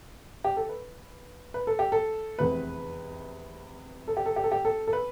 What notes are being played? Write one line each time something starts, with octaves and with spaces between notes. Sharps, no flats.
G4
A4
B4
B4
A4
G4
A4
F1 E2 C3 B4
A4
G4
A4
G4
A4
G4
A4
A4
B4